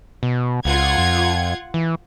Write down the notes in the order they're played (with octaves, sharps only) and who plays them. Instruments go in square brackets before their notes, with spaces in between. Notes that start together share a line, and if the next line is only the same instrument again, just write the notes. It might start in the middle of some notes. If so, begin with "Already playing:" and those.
[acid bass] B2
[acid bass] C#2 [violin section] F4 F#5 G#6
[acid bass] F2
E3